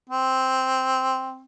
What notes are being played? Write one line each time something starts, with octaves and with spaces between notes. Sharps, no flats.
C4